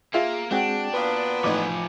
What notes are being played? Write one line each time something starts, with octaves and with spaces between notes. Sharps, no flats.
A#3 F4 G#4 E5 F5
G#3 C4 D4 F#4 G#4 G5
A#2 B3 B4 F5
A1 F3 D#4 G#5 D6